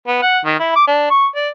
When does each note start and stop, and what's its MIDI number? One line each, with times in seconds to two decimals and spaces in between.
0.07 0.21 59
0.22 0.39 78
0.45 0.57 51
0.59 0.72 64
0.76 0.83 86
0.87 1.09 62
1.10 1.27 85
1.35 1.49 74